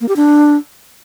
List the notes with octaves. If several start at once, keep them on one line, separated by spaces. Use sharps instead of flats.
A#3
G4
D4